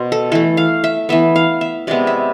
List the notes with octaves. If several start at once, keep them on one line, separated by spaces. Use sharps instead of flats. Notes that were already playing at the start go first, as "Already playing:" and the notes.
Already playing: B2 C5
A4
E3 A3 A4
F5
E5
E3 B3 E5
F5
E5
C3 G#3 B3 D5
E5